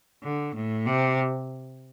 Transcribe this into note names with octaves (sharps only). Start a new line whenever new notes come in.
D3
A2
C3